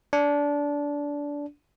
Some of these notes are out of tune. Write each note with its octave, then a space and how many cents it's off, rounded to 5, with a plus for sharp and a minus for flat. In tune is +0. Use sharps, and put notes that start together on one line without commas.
D4 -20